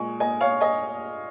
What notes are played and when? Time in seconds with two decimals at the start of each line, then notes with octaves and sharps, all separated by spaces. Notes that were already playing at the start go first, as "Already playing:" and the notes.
Already playing: A#2 G#3 G#5 C#6
0.20 D#5 G#5
0.41 C#5 F5
0.61 D#5 G#5